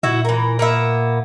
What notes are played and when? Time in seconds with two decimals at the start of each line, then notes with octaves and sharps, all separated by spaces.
0.03 A#2 E4 F#4 E5
0.25 E3 A#4
0.59 A#3 B3 E5